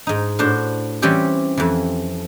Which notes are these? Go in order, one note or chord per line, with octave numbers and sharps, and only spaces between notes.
G#2 D#4
A2 D4 F#4 C5
E3 G3 C4 C#4 G4
F2 E3